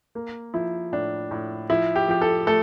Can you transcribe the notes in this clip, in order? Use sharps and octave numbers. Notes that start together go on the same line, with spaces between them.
A#3
F3 E4
A2 D4
A2
F3 E4
G4
F3 G4
A4
A3 A4